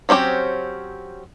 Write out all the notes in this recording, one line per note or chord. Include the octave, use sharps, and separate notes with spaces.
F#3 C4 C#4 G4